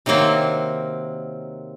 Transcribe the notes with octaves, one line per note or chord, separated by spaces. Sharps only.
C3 D#3 F#3 A#3 C4